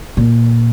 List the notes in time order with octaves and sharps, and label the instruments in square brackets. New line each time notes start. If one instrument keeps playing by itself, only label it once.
[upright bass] A#2